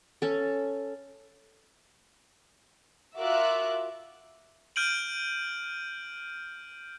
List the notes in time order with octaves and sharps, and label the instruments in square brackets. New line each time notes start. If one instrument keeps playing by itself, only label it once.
[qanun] C#4 A4
[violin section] F4 F#4 A#4 E5 D6 F#6
[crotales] F6 G6 D7 D#7 F#7